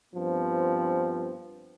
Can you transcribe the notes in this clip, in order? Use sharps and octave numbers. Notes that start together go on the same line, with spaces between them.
G2 F3 B3 C4